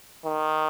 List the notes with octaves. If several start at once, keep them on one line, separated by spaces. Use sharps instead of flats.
D#3